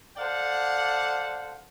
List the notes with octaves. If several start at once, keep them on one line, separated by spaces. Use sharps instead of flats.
A4 C5 D5 F5 F#5